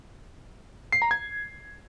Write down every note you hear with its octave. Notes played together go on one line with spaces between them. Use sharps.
C7
A#5
G#6